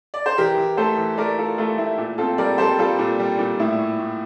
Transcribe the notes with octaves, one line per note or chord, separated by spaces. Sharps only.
D5
C5
E3 G4 A#4
E3
A3 A4 C5
E3
A3 A#4 D5
A3 F4 A4
A3 F4 A4
A3 E4
A#2
C4 F4 A4
G3 A#4 D5
G3 A4 C5
G3 F4 A4
A#2
G3
A#2
A2 E4
A2
A2